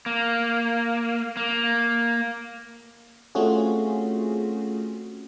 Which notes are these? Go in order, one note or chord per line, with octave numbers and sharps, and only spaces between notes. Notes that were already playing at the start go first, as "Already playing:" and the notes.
A#3
A#3
A3 C4 C#4 F4 F#4 G#4